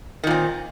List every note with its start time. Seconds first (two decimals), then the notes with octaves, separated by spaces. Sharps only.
0.24 D#3
0.27 A#2
0.31 C4